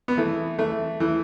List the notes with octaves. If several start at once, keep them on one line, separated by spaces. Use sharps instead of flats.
B3
E3 A3
E3 A3
E3 A3